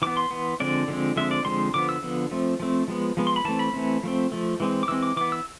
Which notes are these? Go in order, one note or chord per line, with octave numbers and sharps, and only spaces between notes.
E3 B3 D6
C6
E3 B3
D3 F3 G#3 C4 D5
D3 F3 G#3 C4
D3 F3 G#3 C4 E5
D5
D3 F3 G#3 C4 C6
D3 F3 B3 D6
E6
D3 F3 B3
F3 A3 C4
F3 A3 C4
F3 G#3 B3
F3 G#3 B3
C6
B5
E3 A3 C4 A5
B5
E3 A3 C4
F3 A3 C4
F3 A3
E3 G#3 C4
D6
E3 G#3 C4 E6
D6
E3 B3 D6
E6